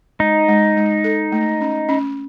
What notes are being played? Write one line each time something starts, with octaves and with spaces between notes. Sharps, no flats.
G#3 D#4
G#3
G#3
A4
A3
C#4
C#4